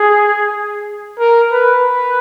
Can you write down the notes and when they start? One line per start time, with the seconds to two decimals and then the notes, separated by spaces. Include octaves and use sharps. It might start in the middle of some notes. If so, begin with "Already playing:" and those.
Already playing: G#4
1.20 A#4
1.52 B4
1.84 B4